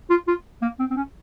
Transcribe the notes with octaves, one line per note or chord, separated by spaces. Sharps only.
F4
F4
A#3
C4
C4
C#4